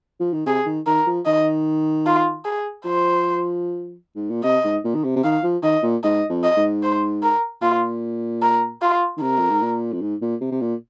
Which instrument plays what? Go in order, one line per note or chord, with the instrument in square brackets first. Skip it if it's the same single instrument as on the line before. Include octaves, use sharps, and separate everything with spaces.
[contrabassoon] F3
D#3
[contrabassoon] C3 [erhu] G#4
[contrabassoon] D#3
[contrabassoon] D#3 [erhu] A#4
[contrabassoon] F3
[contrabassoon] D#3 [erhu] D#5
[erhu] F4
G#4
[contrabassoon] F3 [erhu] C5
[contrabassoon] G#2
A#2
[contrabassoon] C3 [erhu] D#5
[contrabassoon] G#2
A#2
D#3
C3
C3
[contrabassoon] D#3 [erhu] F5
[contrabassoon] F3
[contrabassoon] D#3 [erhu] D#5
[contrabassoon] A#2
[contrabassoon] G#2 [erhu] D#5
[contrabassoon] F2
[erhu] D#5
[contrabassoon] G#2
[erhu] C5
A#4
[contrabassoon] A#2 [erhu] F4
[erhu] A#4
F4
[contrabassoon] D#3
[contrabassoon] C3 [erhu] A#4
[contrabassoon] F2
G#2
A#2
F2
G#2
A#2
C3
C3
A#2